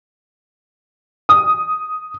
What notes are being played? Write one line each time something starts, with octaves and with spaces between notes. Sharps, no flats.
D#6